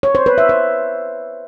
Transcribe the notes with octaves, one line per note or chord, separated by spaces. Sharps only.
C#5
C5
B4
E5
C5